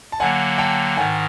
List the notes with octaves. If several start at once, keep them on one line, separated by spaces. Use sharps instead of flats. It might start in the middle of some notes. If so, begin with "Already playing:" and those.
A5
D3 F#3 A#3 F#5 G#5
G5 A5
G#2 D#3 F#5 G#5